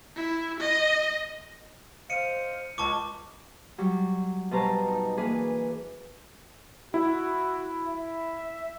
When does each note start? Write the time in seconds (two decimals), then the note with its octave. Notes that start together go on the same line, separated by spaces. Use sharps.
0.17 E4
0.60 D#5
2.10 C5 D#5 F5 C#7 D#7
2.78 C#2 A5 C#6 D6
3.78 F#3 G3
4.51 B2 G3 C5 A5 A#5
4.87 D#4
5.17 E3 A#3 D4 G#4 B4
6.94 E4 F#4
7.85 E5